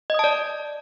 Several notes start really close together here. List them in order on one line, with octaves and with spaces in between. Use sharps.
D#5 D#6 A5 D5